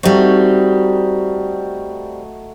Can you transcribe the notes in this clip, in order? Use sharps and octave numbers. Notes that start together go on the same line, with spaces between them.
G3 A3 C4 D#4 F#4